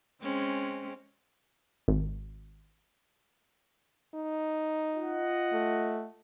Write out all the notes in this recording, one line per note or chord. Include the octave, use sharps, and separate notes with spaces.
G#3 C4 C#4
G#1
D#4
F4 D#5 F#5
A3